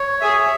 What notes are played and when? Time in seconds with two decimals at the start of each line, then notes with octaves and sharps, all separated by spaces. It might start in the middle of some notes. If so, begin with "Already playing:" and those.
Already playing: C#5
0.21 G#4 E5